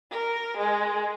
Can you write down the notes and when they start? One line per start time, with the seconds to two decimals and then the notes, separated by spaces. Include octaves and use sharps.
0.12 A#4
0.58 G#3